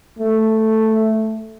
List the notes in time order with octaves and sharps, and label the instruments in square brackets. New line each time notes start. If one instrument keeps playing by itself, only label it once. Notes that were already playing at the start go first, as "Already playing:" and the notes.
[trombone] A3